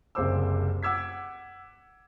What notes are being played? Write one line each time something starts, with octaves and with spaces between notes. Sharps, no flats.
F#1 C2 C5 D6 E6
F#5 D6 E6 G#6 B6